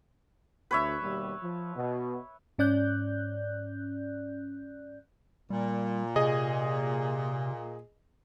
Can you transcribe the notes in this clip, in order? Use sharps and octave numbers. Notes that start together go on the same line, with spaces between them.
D2 B4 C#5 E5
D#2 B2 G3
F3
B2
G#2 C#4 D5 F#6 G6
A#2 G3
C3 G#4 D#5